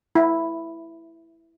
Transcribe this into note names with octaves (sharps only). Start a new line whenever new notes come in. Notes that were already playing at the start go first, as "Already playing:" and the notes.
E4